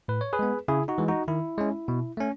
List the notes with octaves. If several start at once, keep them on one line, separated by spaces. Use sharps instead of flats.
A2 B4
C#5
G#4 B4
G#3 B3
C#3 E4 G#4
D#4 F#4
E3 G#3
D#4 F#4
D#3 E4
G#3 C#4
B2
A3 C#4